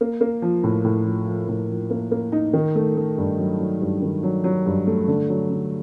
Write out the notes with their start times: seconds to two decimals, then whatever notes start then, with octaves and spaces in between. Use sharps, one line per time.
0.01 A#3
0.21 A#3
0.42 F3
0.64 A2
0.84 A2
1.05 F3
1.26 F3
1.48 A2
1.70 F3
1.90 A#3
2.11 A#3
2.32 D#4
2.53 D#3
2.75 A3
2.97 A3
3.18 G2
3.39 F#3
3.60 F#3
3.81 G2
4.02 D#3
4.23 F#3
4.44 F#3
4.66 G2
4.87 A3
5.08 D3
5.29 F#3
5.50 D3